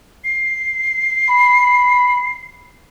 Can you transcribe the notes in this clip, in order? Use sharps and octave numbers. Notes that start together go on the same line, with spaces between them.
C7
B5